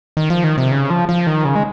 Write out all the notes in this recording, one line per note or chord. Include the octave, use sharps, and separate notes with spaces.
D#3
F3
D#3
C3
C#3
F3
F3
D#3
C#3
G#3